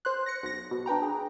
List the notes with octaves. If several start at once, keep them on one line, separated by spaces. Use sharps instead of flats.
C5 C6 F#6
A#6 C#7
B1 A#6
B2
D4 B4 G5 A#5
G#4